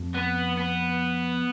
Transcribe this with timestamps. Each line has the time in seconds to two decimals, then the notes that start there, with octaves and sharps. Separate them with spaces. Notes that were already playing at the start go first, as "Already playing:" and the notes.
Already playing: F2
0.15 B3
0.58 B3